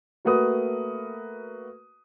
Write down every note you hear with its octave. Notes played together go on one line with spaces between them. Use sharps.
A3 A#3 F#4 B4 D#6